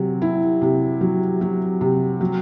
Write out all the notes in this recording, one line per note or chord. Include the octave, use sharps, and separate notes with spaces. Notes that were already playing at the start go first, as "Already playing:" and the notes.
Already playing: C3 F#3
E4
C3
F#3
F#3
C3
F#3